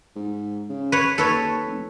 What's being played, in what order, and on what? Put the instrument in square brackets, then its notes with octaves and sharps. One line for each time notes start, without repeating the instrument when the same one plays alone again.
[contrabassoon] G#2
C#3
[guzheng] B4 C#5
[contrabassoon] D#2 [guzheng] A4 B4 C#5
[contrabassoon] F1